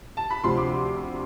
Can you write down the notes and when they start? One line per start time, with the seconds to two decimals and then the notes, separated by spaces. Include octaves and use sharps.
0.17 A5
0.30 B5
0.43 D2 C3 F3 C4 C6
0.57 D6